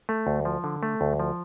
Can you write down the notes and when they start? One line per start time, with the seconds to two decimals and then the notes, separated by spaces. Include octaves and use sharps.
0.09 A3
0.27 D2
0.45 F3
0.64 D3
0.83 A3
1.01 D2
1.20 F3